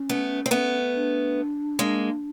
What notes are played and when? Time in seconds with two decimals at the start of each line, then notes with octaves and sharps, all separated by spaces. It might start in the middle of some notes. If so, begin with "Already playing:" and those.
Already playing: C#4
0.09 A3 B3
0.46 C4
0.51 A3 B3
0.95 D4
1.79 G#3 A#3